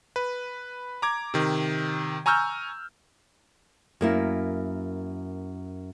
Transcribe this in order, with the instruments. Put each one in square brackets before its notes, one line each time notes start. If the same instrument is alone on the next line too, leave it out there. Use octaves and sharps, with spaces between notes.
[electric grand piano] B4
A#5 D6 G#6
C3 D#3
G#5 A#5 C#6 E6 F6 G6
[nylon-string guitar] F#2 A#3 E4